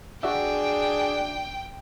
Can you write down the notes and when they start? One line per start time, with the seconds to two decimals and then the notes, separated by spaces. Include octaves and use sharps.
0.23 D4 F#4 G#4 E5 G5